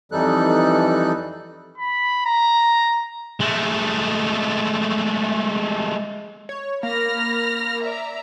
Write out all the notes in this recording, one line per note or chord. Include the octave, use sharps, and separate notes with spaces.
F2 E3 G3 D#4 A4 F#6
B5
A#5
G#3 A3
C#5
A#3 B5 F6 A#6
D5 E5 A#5